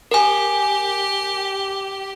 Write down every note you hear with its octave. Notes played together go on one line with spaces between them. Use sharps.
G4 A#4 G#5